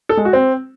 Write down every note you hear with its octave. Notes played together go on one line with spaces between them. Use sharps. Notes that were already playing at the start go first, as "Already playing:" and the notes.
A4
G#3
F#4
C4